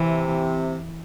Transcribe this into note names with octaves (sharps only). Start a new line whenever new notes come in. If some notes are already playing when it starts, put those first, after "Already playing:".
Already playing: C3 E3